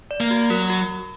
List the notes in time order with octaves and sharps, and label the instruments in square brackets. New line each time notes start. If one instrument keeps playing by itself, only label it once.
[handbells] D5
[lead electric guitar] A#3
[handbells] F#4
[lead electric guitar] F#3 [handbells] A#4
[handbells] F#4